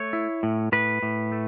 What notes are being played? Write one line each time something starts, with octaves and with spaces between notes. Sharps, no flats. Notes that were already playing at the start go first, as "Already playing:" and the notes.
Already playing: A3 C#5
E4
A2
A2 B4
A2
A3